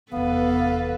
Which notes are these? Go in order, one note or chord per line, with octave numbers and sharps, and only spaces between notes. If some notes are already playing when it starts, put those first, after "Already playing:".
F1 E2 B3 A4 B4 F5